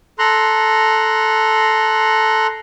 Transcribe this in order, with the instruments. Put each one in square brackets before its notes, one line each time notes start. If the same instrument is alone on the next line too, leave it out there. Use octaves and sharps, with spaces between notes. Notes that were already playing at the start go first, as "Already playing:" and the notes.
[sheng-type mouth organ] A4 A#5 C6 F#6